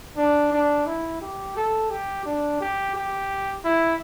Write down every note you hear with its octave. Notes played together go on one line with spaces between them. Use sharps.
D4
D4
E4
G4
A4
G4
D4
G4
G4
E4